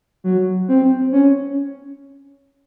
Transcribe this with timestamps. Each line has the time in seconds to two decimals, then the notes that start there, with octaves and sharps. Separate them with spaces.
0.24 F#3
0.68 C4
1.12 C#4